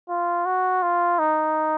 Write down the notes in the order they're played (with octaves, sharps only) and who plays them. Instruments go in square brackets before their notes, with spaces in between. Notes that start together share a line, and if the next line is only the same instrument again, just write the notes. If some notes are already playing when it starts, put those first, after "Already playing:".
[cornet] F4
F#4
F4
D#4